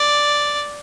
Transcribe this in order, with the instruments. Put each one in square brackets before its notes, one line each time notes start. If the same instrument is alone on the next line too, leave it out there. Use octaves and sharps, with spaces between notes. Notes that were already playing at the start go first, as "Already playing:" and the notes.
Already playing: [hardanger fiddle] D5